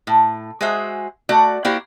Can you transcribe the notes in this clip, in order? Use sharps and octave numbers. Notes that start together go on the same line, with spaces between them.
A2
G#3 F#4 G#4 C5 E5
A3 F#4 D5
A#3 E4 F#4 G4 C5 D5